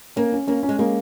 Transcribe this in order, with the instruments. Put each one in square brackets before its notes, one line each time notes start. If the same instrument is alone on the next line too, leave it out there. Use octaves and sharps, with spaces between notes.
[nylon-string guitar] A#3 [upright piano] C#4
[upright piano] C#4
[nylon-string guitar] A#3 [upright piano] C#4
[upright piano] C#4
[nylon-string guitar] G#3
[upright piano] G#3 [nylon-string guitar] A#3